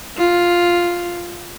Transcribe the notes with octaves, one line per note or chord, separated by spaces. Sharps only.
F4